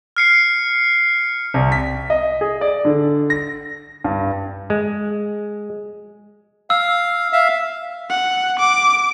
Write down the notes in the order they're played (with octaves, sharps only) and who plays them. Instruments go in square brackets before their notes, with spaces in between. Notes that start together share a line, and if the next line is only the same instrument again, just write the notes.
[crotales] F6 C7 C#7
[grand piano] C2
B6
D#5
G#4
D5
D3
A#6
G2
[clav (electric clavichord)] G#3
[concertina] F5 [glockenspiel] E6
[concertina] E5 F5
[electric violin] F#5
D6